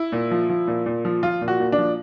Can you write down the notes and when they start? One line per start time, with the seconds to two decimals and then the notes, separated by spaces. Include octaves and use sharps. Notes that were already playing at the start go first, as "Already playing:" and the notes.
Already playing: E4
0.12 A#2
0.31 F3
0.50 F3
0.68 A#2
0.86 A#2
1.05 F3
1.23 F3 F4
1.41 A#2
1.48 F#4
1.60 A#2
1.72 D4
1.78 F3